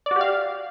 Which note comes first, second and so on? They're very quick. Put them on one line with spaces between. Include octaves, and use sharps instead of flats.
D5 F#4 G4 F5